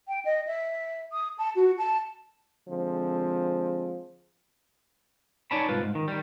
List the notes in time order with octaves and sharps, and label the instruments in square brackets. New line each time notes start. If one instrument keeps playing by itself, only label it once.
[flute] G5
D#5
E5
D#6
A5
F#4
A5
[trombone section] D3 F3 G#3 C4
[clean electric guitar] D#4 C#5 D5 G#5 A5 B5
C2 G#2 F4 B4
G#2
D#3
D#3 G3